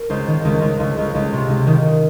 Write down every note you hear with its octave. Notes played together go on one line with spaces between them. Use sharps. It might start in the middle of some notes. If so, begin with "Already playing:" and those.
Already playing: A#4
C#2 C5
D#3
C#2
C#2
C#2
C#2
C#2
C3
C#2
D#3